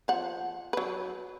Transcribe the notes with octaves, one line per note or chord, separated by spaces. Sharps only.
F3 F#5
F#3 B4